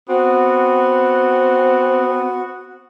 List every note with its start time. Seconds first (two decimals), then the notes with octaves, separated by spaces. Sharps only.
0.09 B3 C4 F#4